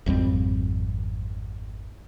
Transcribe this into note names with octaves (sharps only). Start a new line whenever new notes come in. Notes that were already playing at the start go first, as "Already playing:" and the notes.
G#1 F2 G3 C4